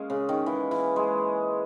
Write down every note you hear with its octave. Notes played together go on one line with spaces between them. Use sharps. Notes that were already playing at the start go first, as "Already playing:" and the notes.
Already playing: G#3 A#3 C#4
C#3
D#3
E3
E3
G#3